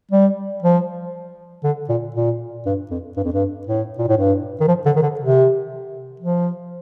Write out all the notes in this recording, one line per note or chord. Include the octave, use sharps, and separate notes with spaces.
G3
F3
D3
A#2
A#2
G2
F2
G2
F2
G2
A2
A#2
A2
G2
D#3
F3
D3
D#3
D3
C3
F3